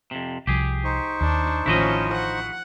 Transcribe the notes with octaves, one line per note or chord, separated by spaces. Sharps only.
F2 C3
C2 F3 G4 G#4
D#4 C5 C#6
D#2 D4
A1 D#3 F3 C#4 D4 E4 F#4 D#5
F#5